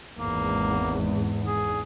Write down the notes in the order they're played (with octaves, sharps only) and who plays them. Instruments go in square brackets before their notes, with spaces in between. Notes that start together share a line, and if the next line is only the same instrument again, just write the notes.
[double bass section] G#1 E2 G#2 [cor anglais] A#3
[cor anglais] G#4